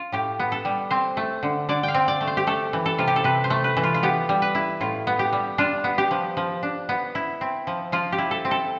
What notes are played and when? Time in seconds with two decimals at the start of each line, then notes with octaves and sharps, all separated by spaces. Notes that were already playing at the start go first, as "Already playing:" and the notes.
Already playing: F4
0.12 A2 G4
0.39 B3
0.52 A4
0.65 G3
0.91 C4 C5
1.17 A3
1.43 D3
1.69 D3 D5
1.83 F5 G5
1.94 C4
2.08 D5
2.21 A3
2.27 C5
2.37 G4
2.47 A3 A4
2.73 E3
2.86 A4
2.98 C3 F4
3.07 G4
3.16 A4
3.24 C3 B4
3.44 C5
3.50 A3
3.64 B4
3.77 E3
3.84 F4
3.94 F4
4.03 B3 G4
4.29 G3
4.42 B4
4.55 E4
4.81 A2 F4
5.07 B3
5.19 G4
5.33 G3
5.58 D4 F4
5.84 B3
5.98 G4
6.11 F3
6.37 F3
6.63 D4
6.89 B3
7.15 E4
7.41 C4
7.67 F3
7.92 F3 F4
8.12 G4
8.18 E4
8.31 A4
8.45 C4
8.51 A4